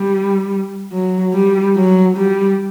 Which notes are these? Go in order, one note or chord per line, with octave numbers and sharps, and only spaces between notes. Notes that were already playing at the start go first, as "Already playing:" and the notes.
Already playing: G3
F#3
G3
F#3
G3